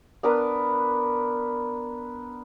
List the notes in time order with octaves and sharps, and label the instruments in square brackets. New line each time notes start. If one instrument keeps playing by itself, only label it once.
[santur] B3 D4 A#4 B4